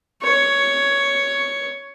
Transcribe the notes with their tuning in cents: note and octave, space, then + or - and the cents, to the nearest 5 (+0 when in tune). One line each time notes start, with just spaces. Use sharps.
C#5 +10